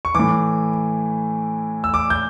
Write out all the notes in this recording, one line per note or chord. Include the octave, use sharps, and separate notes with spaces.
C#6
A2 E3 D6
E6
D6
G6